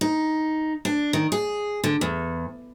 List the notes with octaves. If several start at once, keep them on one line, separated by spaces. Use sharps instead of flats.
D#4
D4
D#3
G#4
D3
E2